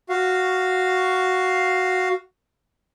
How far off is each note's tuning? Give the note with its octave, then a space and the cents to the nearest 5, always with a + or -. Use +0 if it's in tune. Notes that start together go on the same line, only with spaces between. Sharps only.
F#4 +0 F5 +0